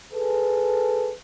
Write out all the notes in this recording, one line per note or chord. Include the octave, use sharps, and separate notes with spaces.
G#4 A4 B4